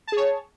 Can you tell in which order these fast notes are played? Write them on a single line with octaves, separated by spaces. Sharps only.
A5 G#4 C#5